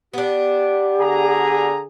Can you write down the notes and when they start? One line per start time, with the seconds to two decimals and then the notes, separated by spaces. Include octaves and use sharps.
0.14 B3 D4 G4
1.00 D3 G#4 A#5